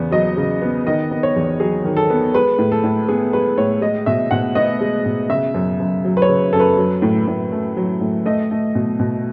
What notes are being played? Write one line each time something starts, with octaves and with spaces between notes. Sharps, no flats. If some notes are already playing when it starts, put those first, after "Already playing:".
Already playing: E2 C#3 B3
F#3 D#5
C#3
B3
D#3 D#5
B3
C#5
E2
F#3 G#4
D#3
A4
B3
G#3 B4
A2
A4
A2
B3 G#4
G#3 B4
A2 C#5
G#3 D#5
B2 E5
B2 F#5
B3 D#5
G#3
B2
C#3 E5
F#2
F#2
F#3
B4
C#5
C#3
F#2 A4
B4
F#3
A2
A2
A3
F#3
A2
A3 D#5
A3
B2
B2